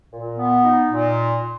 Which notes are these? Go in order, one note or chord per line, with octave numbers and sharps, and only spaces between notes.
A#2
B3
D#4
A#2